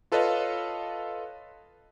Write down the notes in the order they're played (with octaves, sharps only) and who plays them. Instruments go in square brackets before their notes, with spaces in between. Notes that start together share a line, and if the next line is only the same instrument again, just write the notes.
[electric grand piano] F4 A4 B4 C#5 D#5 F5